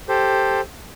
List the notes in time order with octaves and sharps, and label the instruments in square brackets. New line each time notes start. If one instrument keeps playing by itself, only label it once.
[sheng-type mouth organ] G4 A4 C5